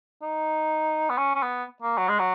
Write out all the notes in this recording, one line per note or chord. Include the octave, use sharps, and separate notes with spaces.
D#4
B3
C#4
C#4
B3
A#3
F#3
G#3
F#3